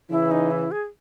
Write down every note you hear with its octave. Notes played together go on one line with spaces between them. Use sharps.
C#3 E3 E4
D#4
E4
G#4